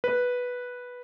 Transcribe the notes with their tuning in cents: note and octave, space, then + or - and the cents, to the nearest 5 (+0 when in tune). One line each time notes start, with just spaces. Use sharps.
B4 -5